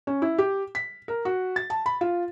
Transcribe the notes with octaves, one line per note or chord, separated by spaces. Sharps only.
C#4
E4
G4
B6
A#4
F#4
A6
A5
B5
F4